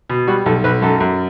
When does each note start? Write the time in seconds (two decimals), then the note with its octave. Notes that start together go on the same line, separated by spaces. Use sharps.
0.10 B2
0.28 G3 F#4
0.46 B1 A4
0.64 B1 B4
0.82 F#2 A4
1.00 F#2